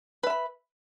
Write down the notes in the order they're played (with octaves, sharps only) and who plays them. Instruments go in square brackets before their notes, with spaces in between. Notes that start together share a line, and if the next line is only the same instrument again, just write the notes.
[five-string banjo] B4
E5
B5